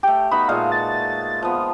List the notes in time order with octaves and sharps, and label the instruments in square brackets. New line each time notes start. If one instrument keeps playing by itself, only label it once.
[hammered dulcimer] A3 G4 [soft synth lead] G5
[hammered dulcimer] B3 D#4 F#4 [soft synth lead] B5
[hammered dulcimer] A#2 G#3 A3 [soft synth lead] F5
[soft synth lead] A6
[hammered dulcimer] F3 B3